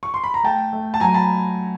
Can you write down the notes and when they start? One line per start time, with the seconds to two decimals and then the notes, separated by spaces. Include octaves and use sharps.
0.03 C#6
0.14 C6
0.24 B5
0.34 A#5
0.44 A3 G5 A5
0.73 A3
0.94 A5
1.00 F#3 G#5 A#5
1.14 A5 B5